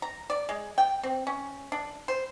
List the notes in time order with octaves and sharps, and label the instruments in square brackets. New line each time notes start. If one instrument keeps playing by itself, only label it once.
[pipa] A#5
D5
G#3
G5
C4
C#4
D4
C5